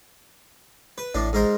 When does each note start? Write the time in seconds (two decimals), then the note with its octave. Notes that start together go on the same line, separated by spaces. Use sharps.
0.98 B4
1.14 A1 A2 D4
1.33 G#2 A#4 C5